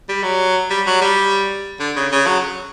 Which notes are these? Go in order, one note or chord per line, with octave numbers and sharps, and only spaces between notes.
G3
F#3
G3
F#3
G3
D3
C#3
C#3
F#3